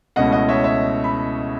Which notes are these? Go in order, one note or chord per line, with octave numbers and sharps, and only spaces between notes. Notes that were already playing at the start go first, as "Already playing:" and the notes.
C#2 B2 A3 C#4 E4 D#5 F#5
D#5 F#5
C#5 E5
C#5 E5
B5